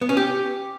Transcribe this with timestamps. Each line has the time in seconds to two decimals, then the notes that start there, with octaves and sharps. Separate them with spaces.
0.01 B3
0.09 C#4
0.17 G4